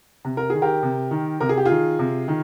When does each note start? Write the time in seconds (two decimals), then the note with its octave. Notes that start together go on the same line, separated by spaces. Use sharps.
0.25 C3
0.37 A#4
0.50 D#3 G#4
0.62 G4 A#4
0.83 C3
1.11 D#3
1.40 C3 A#4
1.49 G#4
1.57 G4
1.65 D#3 F4 G#4
1.99 C3
2.28 D#3